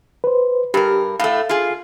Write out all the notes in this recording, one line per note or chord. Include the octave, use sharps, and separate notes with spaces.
B4 C5
G2 G4 A#4
A2 A3 F5
F4 G#4